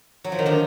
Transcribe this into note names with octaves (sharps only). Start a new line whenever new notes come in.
F#3
F3
D#3
D3 F3